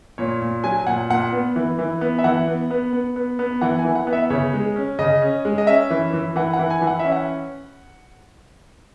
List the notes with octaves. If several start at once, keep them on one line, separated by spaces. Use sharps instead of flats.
A#2 C#5
A#2
F#3 G#5
G#5
A#2 F#5
A#2 F#5
B3
E3
E3
B3
E5
E3 F#5
B3
B3
B3
B3
B3
E3 F#5
G#5
E3
F#5
B3
E5
C#3 C#5
G#3
C#4
C#3 D#5
C#4
G#3
D#5
C#4 E5
E3
E3
E3 F#5
F#5
E3
G#5
E3
F#5
C#4 E5
F#5